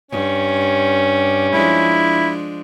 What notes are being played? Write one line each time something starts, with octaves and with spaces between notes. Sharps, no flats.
G2 C#4
F3 G#3 D4 E4